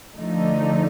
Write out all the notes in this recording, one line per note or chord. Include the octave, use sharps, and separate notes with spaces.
D3 F3 A3 D#4